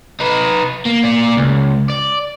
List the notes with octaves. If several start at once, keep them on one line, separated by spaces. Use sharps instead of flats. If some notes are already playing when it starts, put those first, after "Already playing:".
D#4 B4
A#3
A#3 D5
C#2
D5